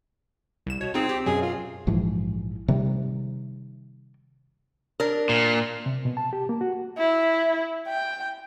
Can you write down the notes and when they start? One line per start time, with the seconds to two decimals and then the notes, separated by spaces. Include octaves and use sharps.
0.66 C2 E7
0.81 B2 C#5
0.94 C4 D#4 F4 G#4
1.09 G4
1.26 F#2 B2 F#3 G#4
1.42 F4
1.87 A#1 G#2 E3 F3
2.68 C3 D#3 G3
5.00 D4 A#4
5.29 A#2
5.86 C3
6.05 B2
6.17 A5
6.33 G4
6.49 A#3
6.61 F#4
6.98 E4
7.88 G5